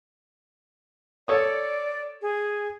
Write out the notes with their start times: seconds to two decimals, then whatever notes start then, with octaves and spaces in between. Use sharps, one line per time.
1.28 A4 C#5 D5 D#6
2.22 G#4